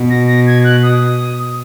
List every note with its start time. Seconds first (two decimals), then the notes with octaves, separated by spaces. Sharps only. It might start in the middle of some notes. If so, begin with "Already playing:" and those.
Already playing: B2
0.10 A#6
0.28 A#6
0.47 G#6
0.64 F#6
0.83 D#6